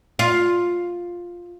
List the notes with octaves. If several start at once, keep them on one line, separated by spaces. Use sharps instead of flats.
F4